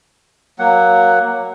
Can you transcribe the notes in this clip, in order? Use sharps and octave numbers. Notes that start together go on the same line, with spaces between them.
F#3 A#3 F#5